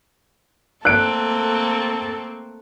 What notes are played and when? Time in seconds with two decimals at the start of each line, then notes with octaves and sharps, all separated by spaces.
0.85 A3 A#3 C4 A4 F#6 D7